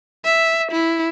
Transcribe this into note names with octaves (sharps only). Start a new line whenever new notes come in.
E5
E4